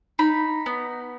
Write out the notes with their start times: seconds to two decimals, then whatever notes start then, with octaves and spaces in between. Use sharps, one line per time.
0.19 D#4 B5
0.66 B3